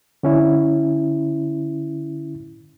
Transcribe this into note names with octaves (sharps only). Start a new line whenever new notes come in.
D3 C#4 E4